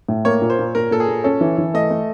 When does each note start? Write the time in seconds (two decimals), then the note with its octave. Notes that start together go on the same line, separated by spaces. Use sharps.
0.09 A2
0.25 A#3 C#5
0.41 A#2
0.50 C5
0.59 A#2
0.75 A#2 A#4
0.91 A#2 A4
1.00 G#4
1.08 A#2
1.24 C#4 A4
1.41 E3
1.58 E3
1.74 A3 D#5
1.90 A3